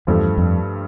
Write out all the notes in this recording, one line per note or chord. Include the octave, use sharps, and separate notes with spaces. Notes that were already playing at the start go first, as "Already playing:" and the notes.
E2 G2 F3 A3
F2